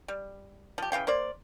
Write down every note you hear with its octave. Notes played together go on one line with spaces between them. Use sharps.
G3
F3 G4
C#3 E3 F5 G5
A#3 C5 D5